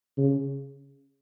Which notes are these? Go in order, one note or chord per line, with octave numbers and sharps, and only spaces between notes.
C#3